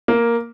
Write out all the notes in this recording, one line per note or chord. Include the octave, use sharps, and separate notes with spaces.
A#3